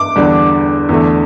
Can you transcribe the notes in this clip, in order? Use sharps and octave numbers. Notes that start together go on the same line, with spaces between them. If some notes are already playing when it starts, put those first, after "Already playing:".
Already playing: D6
E2 D3 G3
E2 D3 A3